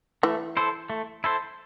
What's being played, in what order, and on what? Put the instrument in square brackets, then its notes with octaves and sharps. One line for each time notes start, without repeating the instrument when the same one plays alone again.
[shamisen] E3 [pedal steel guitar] A3
[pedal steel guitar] E4 A4 C5
A3
E4 A4 C5